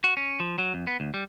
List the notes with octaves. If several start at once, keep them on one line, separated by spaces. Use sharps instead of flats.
F#4
C#4
F3
F#3
F2
B3
D2
G3